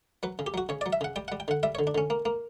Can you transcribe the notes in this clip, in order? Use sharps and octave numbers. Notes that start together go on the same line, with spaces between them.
F#3 B4
C#3
G4
F#3 F#4
C#3 C#5
D5
F#3
E5
C#3 F#5
G3 G5
F#5
G3
G5
D3 F#5
G3 E5
C#5
D3
D4
D3 C#4
A#3
A#3